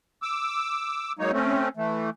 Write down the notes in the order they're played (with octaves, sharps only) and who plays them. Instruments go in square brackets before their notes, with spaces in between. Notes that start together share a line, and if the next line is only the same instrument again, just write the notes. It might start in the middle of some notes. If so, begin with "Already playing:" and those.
[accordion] D6 E6
F#3 G#3 A#3 D#4 C#5
A3 C4 C#4
E3 A3